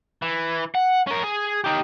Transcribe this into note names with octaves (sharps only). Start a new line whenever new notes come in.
E3
F#5
C#4 A#4
G#4
D#4 G4